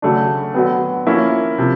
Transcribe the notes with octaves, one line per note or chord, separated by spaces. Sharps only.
C#3 F#3 A3 D4
D3 F#3 B3
F3 A#3 C#4 E4
C3 F3